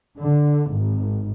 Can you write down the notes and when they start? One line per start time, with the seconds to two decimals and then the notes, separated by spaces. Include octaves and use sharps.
0.17 D3
0.71 G#1